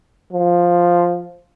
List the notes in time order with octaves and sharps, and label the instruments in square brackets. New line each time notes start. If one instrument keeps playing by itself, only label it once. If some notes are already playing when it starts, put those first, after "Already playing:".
[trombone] F3